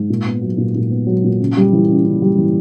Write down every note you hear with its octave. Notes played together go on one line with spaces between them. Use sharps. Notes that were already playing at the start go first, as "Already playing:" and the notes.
Already playing: G#2
A#2
B3
F#3
A#2
A#2
B3
F#3
A#2
C#3
G3
E3
C#3
C#3
G3
E3